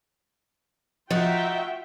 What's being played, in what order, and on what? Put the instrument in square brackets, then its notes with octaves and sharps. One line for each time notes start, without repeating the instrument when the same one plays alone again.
[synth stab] F3 F#5 A6 [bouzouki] D#4 [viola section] F4 E5 G5 [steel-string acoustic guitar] F#4